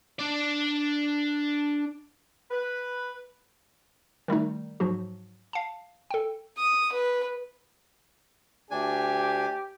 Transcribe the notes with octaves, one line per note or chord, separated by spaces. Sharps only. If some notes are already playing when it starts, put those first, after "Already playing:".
D4 D5
B4
D#3 G3 A3 D#4
G#2 F3 F#3 F#4
F5 A5
A4 G5
D#6
B4
D2 D4 G4 G#5